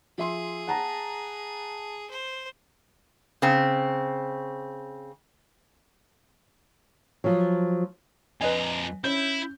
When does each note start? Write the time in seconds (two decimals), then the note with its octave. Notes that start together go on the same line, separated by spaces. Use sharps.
0.18 F3 G#4 E5 C6
0.67 F#5 A5 A#5
2.10 C5
3.42 C#3 C4
7.24 F3 F#3
8.41 F2 B4 D#5 G#5 A#5
9.04 C#4 E4 G6